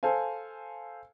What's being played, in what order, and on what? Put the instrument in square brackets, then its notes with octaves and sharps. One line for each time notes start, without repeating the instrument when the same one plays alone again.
[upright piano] A4 C5 F5 G#5